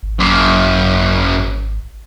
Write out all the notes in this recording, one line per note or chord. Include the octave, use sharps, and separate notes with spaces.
G#1
F#2 A#3